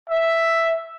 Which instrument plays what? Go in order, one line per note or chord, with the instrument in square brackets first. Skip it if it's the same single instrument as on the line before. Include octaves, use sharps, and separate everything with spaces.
[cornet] E5